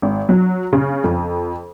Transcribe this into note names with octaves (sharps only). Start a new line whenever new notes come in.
G#1
F#3
C#3
F2